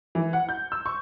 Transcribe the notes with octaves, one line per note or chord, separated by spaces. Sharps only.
E3
F#5
G6
E6
C#6